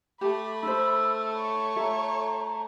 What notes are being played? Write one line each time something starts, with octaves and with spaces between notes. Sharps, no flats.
A3 G4 B5 D6
D#4 A4 C5 E6
C#5 B5
F4 A4 E5 A#5